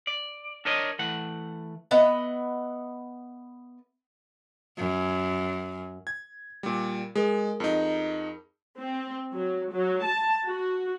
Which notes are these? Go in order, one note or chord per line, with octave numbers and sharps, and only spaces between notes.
D5
D4 A#4 C#5 D#5
E3 A3 F#5
B3 D#5 E5 F#5
F#2
G#6
A#2 G3
G#3 G#4 A#4
F2 D#4
C4
F#3
F#3
A5
F#4